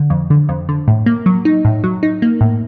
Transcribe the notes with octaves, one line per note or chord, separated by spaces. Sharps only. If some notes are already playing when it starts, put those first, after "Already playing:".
Already playing: D3
F2
D3
F2
D3
A2
A#3
F#3
D#4
A2
F#3
D#4
A#3
A2